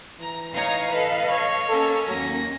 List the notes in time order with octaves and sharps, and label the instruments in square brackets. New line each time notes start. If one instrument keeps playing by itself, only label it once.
[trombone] E3 [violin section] A#5
[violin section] D#4 C#5 A#5 [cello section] D#5 F5
[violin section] A4 B4
[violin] C#5
[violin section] A#3 C#4 [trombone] A4
[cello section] D#2 [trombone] F#3 [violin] A#6